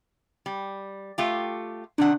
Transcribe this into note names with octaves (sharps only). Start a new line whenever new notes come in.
G3
A3 F4 G4
C3 D#3 D4 F#5